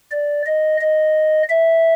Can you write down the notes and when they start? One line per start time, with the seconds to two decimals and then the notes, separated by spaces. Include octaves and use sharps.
0.11 D5
0.45 D#5
0.80 D#5
1.49 E5